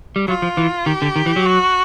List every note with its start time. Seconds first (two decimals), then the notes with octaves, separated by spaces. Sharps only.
0.16 G3
0.28 F#3 F4
0.42 F3
0.57 E3
0.86 D#3 G4
1.02 D3
1.16 D#3
1.26 E3
1.36 F#3
1.45 F#4